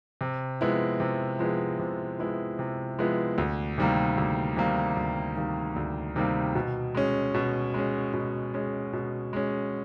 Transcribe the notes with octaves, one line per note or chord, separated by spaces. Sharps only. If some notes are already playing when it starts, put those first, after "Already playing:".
C3
F3 G#3 B3 E4
C3
F3 G#3 B3 E4
C3
F3 G#3 B3 E4
C3
F3 G#3 B3 E4
D2
C3 D#3 G3 A#3
D2
C3 D#3 G3 A#3
D2
C3 D#3 G3 A#3
D2
C3 D#3 G3 A#3
B2
G#3 C#4
B2
G#3 C#4
B2
G#3 C#4
B2
G#3 C#4